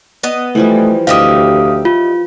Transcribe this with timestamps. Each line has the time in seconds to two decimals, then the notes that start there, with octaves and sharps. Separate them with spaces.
0.23 B3 D#5
0.55 E3 F3 G3 A3
1.07 D2 D#4 G4 E5 F5 D#6
1.85 F4